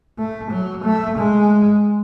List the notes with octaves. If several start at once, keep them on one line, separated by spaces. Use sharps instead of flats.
A3
F#3
A3
G#3